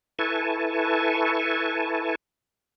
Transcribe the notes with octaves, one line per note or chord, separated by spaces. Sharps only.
E4 A4 B4 G#5 A5 C#6